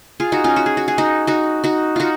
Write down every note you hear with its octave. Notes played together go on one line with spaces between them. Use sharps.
F4 G#4
D#4 F#4
C#4 F4
F#4
G#4
F#4
G#4
D#4 F#4
D#4 F#4
D#4 F#4
D#4 F4 F#4